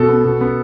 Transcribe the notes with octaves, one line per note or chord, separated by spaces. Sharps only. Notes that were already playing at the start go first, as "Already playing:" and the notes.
Already playing: B2 A4
B3
B2
B3